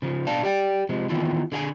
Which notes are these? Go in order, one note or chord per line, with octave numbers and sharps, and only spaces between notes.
C#3 F3
B2 D4 D5 F5 A5
G4 D5 G5
C3 F3 G#3
D#3 E3 B3 E4 F4
D3 G#4 F5 G#5